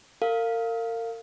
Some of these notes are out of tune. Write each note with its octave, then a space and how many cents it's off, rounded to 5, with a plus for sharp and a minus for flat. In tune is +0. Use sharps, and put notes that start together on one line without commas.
A#4 -35 F5 +0